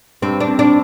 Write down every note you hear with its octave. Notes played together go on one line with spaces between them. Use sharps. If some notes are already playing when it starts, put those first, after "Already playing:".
G2 C4
D4
C4
D4